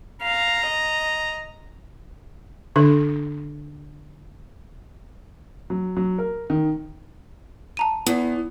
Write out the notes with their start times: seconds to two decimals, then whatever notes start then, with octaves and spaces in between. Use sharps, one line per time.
0.22 F5 A#5
0.66 D#5
2.76 D3 D4 A4
5.70 F#3
5.97 F#3
6.18 A#4
6.50 D#3
7.77 A5 A#5 D#7
8.06 E2 B3